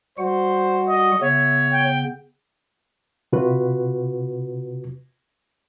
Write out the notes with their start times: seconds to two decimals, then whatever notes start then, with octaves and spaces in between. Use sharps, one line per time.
0.18 G3 F#4 C5 F#5
0.88 D#5
1.21 C#3 B3 C#5 E5
1.72 G5
3.33 C3 F4 F#4 B4